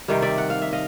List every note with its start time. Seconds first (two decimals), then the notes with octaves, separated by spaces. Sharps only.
0.08 C3 D#3 G3
0.22 D5 E5
0.38 F#5
0.50 F5
0.62 E5
0.73 D#5 F5